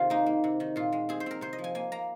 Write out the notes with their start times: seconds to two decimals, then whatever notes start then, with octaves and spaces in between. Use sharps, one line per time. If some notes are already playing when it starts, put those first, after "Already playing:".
Already playing: C3 D#3 F4 G#4
0.10 A#3 D#4
0.26 A#3
0.44 C3
0.60 D#3
0.76 A#2 F4
0.93 G#3
1.09 C4 G#4
1.20 C5
1.26 C4 A#4
1.41 C3 C5
1.53 D#5
1.58 F3
1.64 G#5
1.75 A#3 G#5
1.92 A#3 A#5